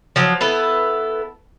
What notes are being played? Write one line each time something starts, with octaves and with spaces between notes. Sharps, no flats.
F3 F#3
B3 E4 A4